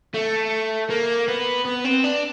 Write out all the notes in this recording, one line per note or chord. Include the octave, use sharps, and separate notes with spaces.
A3
A#3
B3
B3
C4
D4